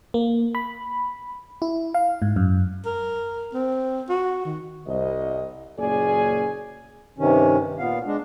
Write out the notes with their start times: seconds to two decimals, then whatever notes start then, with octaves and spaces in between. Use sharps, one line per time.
0.14 A#3
0.55 B5
1.62 E4
1.94 F5
2.22 G#2
2.36 F#2
2.86 A#4
3.54 C4
4.09 F#4
4.45 D#3
4.87 C2 D#5
5.78 F#1 A#2 C#4 G#4 D5 G#5
7.18 G2 C3 D#3 C#4
7.79 A#2 B3 F5
8.06 G#3 D4